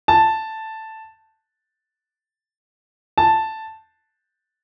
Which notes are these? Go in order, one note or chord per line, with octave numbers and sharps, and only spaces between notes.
A5
A5